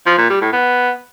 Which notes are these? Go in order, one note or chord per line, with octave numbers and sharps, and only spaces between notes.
F3
A#2
G3
A2
B3